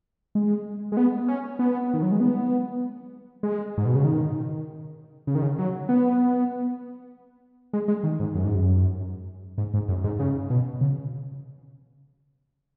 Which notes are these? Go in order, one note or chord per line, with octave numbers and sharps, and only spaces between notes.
G#3
G#3
B3
C#4
B3
D#3
F#3
G#3
B3
G#3
G#2
B2
C#3
D#3
C#3
D#3
C#3
F#3
B3
G#3
G#3
D#3
G#2
F#2
G#2
F#2
G#2
G#2
F#2
G#2
C#3
B2
C#3